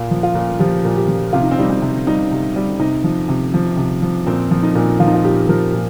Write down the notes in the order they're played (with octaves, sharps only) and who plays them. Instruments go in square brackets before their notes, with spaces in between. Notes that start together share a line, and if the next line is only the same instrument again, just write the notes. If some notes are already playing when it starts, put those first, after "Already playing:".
Already playing: [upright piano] A#2 F4
F3
F4
A#2
F3 G4
A#2
G4
F3
C3 F4
D#4
C4
G3 D#4
C4
C3
G3 D#4
C3
G3
C3 D#4
F3
C3
F3
C3
F3
A#2 C4
F3
D#4
A#2
F3 F4
D#4
F4
A#2 G4
F3 A#4
A#2